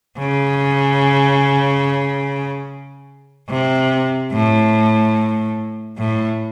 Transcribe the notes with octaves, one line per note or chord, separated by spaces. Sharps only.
C#3
C3
A2
A2